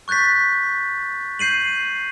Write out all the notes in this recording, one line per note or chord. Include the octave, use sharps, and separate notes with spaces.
C#6 F#6 G6 A6 B6
G6 C7 D#7 F#7